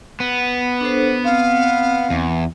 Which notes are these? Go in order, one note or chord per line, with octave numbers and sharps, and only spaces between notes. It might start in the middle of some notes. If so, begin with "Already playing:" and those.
B3
D4 A4 C5
C4 F5
E2